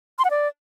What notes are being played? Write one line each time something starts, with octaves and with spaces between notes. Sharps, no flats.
C6
F#5
D5